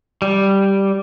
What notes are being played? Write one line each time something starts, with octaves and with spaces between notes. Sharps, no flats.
G3